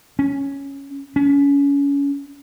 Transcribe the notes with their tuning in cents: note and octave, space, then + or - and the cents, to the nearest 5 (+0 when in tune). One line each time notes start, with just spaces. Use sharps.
C#4 +0
C#4 +30